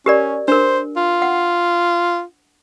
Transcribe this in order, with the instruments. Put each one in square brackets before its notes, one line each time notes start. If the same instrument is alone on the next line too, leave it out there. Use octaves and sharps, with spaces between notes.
[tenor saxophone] C#4 [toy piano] G4 A#4 D5
[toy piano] D4 A#4 [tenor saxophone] C5
[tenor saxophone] F4
[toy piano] F#5